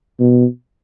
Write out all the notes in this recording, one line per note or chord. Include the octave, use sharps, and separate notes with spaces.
B2